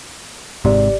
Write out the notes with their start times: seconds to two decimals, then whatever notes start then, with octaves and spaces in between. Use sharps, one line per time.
0.65 G#1 G#2 C3 G4 D5